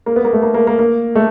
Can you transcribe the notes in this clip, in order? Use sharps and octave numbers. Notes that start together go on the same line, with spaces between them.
A#3
B3
A#3
A3
A#3
A#3
A#3
A#3
A3